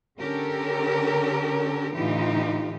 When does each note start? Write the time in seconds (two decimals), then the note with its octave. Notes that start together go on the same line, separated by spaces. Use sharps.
0.19 D3 C#4 G4 A4 A#4
1.94 A2 D3 E3 D#4 F4 G4